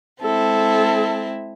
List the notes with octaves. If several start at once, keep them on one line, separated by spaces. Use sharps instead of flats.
G#3 C4 E4 A4